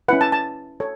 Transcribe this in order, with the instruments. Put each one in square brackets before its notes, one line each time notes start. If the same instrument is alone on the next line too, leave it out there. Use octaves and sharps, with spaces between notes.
[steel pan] C#4 E4 B4 F#5
A5
A5
A4 C#5